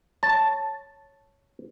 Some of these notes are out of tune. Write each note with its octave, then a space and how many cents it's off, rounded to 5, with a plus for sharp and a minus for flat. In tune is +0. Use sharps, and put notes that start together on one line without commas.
C#5 +0 A5 +0